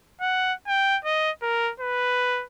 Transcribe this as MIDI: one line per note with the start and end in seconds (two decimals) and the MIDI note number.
0.21 0.53 78
0.67 0.98 79
1.05 1.31 75
1.42 1.72 70
1.80 2.44 71